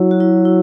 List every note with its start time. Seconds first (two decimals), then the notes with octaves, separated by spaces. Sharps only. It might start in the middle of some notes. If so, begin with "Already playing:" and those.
Already playing: F#3 E4
0.11 F#4
0.20 E4
0.45 E4